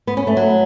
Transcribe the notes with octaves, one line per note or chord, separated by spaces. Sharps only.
B3
C#4
A3
F#3